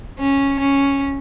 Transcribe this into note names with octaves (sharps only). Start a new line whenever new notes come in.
C#4
C#4